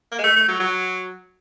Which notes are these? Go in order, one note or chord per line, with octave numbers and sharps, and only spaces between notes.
A#3
G#3
A3
A3
F#3
F#3